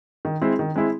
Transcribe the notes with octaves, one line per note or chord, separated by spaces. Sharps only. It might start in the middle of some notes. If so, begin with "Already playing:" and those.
D#3
G#3 C4 E4
D#3
G#3 C4 E4